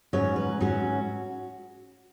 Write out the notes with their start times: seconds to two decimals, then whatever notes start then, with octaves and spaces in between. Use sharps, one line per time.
0.13 G#2 F#3 C#4 C#5
0.36 B4
0.60 G#2 F#3 C#4 F#4